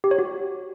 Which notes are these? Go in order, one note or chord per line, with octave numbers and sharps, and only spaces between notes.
G4
C#5
F#4